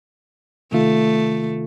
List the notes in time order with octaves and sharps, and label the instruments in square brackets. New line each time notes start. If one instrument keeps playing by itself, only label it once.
[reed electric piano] C3 D#3 F4 [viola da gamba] A3